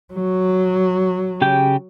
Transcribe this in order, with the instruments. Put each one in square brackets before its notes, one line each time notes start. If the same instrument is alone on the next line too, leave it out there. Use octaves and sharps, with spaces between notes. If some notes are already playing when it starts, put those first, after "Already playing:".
[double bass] F#3
[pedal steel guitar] C#3 G4 G5